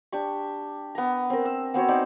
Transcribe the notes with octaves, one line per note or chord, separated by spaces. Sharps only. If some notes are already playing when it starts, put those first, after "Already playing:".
D4 G4 C#6
B3 A#5
C4 A#4
E6
B3 C4 F#4 C#5
D#4 C5 D5